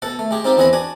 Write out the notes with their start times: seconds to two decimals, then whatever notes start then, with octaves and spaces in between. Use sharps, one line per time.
0.02 B2 A4 F#5
0.19 A3
0.31 G#3 G4 G#4
0.44 C4 D#4 F4 G4
0.57 E2 C4 G#4 B4 D#5 B5
0.73 D4 F#4 G#5